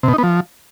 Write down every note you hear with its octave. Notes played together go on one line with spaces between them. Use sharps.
C3
B2
D#4
B3
F3